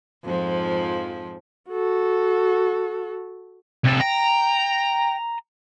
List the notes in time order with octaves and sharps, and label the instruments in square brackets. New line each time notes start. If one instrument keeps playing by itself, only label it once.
[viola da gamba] F2 G#2 F3
[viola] F#4 A4
[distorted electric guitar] C2 A4
[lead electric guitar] G5 [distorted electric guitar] A#5